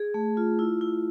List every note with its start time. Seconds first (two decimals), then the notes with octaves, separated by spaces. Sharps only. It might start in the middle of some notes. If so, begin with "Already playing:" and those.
Already playing: G#4
0.14 A3
0.37 F4
0.59 E4
0.81 E4